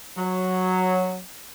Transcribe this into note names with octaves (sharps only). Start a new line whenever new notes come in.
F#3